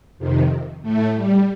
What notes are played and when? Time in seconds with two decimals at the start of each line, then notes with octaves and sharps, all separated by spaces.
0.18 F2 C3 D#3
0.82 A2 A3
1.15 G3